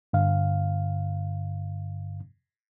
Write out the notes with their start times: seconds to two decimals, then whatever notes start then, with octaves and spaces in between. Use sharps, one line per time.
0.13 G2 D3 F5